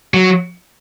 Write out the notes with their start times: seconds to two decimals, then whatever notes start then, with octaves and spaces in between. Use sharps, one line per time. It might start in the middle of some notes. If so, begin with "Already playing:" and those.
0.14 F#3